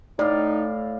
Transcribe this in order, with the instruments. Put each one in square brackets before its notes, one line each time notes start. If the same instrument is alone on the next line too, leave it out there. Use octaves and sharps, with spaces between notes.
[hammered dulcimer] A2 F5 [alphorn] D#4 [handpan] D5